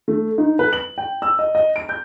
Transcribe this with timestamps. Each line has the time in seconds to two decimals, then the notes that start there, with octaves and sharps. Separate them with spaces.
0.08 A3
0.38 D#4
0.59 B4
0.73 F#7
0.98 G5
1.22 E6
1.39 D#5
1.55 D#5
1.76 D7
1.89 G6